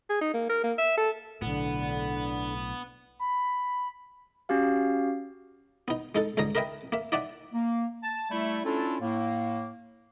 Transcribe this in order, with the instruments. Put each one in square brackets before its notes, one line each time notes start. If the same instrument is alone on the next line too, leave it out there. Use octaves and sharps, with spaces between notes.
[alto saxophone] G#4
D#4
A#3
A#4
A#3
E5
A4
[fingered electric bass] B1 A2 [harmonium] D3 [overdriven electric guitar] B3
[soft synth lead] B5
[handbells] C#4 F#4 G4 F5
[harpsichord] B3 D#4
G#3 D#4 A4
C#2 G#2 D3 A#5 D#6
A#4 B4 D#5 E5 G5 G#5
A#3 E5
D#4 D5 E5 F#5 G#5
[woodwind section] A#3
A5
G3 A3 E4
C#4 D4 E4 F4 A4
A2 A#3